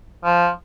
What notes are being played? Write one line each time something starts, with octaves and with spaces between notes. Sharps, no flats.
F3